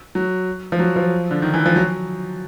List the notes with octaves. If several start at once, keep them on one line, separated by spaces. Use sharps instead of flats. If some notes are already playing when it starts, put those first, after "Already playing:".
F#3
F3
F#3
F3
D3
D#3
E3
F3
F#3